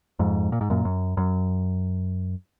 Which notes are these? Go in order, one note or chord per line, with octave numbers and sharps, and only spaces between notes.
F2 G#2
A#2
G#2
F#2 A#2
F#2
F#2